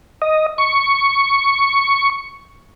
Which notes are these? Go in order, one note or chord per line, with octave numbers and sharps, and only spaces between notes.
D#5
C#6